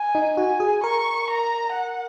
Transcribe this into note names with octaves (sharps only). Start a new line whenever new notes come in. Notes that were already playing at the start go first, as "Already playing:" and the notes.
Already playing: G#5
D#4
F#4 G#5
G#4
A#4 C#6
A#5
F#5